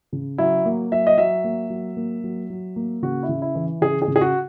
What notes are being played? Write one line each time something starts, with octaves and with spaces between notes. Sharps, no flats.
C#3
F#3 E4
A#3
F#3 E5
D#5
F#3 E5
A#3
F#3
A#3
F#3
F#3
A#3
C#3 F#4
E4
C#3
E4
E3
C#3 G#4
G#4
C#3
G#4
F#4